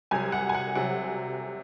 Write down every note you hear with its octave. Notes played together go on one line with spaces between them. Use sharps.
C2 C3 F#3 G#5
F#5
G#5
F#5
C3 F#3 F#5